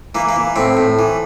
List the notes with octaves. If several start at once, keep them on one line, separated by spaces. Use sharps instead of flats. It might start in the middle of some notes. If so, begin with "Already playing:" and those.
E3 A#3
A#3
E3
A2 C4
A2
E3